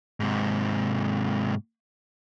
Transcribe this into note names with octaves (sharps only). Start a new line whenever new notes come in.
G#2 C3